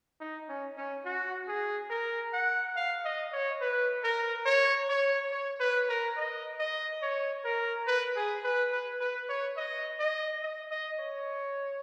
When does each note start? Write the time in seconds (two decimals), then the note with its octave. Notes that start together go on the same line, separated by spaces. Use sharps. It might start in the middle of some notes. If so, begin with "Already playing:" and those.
0.20 D#4
0.49 C#4
0.78 C#4
1.05 F#4
1.48 G#4
1.91 A#4
2.33 F#5
2.76 F5
3.05 D#5
3.33 C#5
3.61 B4
4.04 A#4
4.46 C#5
4.89 C#5
5.32 C#5
5.60 B4
5.89 A#4
6.17 D#5
6.59 D#5
7.02 C#5
7.45 A#4
7.87 B4
8.16 G#4
8.44 B4
8.72 B4
9.01 B4
9.29 C#5
9.57 D#5
10.00 D#5
10.43 D#5
10.71 D#5
10.99 C#5